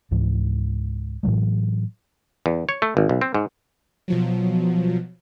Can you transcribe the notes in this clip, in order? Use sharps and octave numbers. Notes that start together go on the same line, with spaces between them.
C#2 G#2 E3
A2 E3 F#3 G#3
E2
C#5
A3
G#1
B1
C4
G#2
B2 F3 F#3